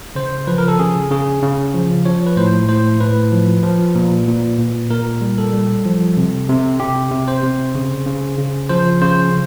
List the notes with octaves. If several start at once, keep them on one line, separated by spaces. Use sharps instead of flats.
C#3 C5
F3 B4
A#4
A4
C#3 G#4
C#3 G#4
C#3
F3
F3 C#5
B4
A2 C5
A2 C5
A2 B4
F3
F3
A#2
A#2
A#2
A#2 A#4
G3
A4
G3
F3
C3
C3
C3 G4
C3
C5
C3
C#3
C#3
C#3
F3 C5
C#3 C5